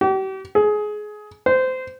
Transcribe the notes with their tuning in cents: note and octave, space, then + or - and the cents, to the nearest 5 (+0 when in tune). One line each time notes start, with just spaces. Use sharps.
G4 -40
G#4 +20
C5 -20